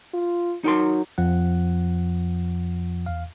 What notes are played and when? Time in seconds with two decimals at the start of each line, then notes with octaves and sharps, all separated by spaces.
0.13 F4
0.64 F#3 D#4 A#4 C6
1.18 F2 F3 F#5
3.06 E2 F5